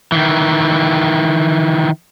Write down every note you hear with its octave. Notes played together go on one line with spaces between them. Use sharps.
D#3 E3